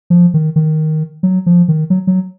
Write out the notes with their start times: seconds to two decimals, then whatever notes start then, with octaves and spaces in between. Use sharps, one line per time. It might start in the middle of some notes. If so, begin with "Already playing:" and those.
0.10 F3
0.34 D#3
0.56 D#3
1.23 F#3
1.46 F3
1.68 D#3
1.90 F#3
2.07 F#3